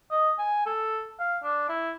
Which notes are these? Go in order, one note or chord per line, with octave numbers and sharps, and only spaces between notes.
D#5
G#5
A4
F5
D4
E4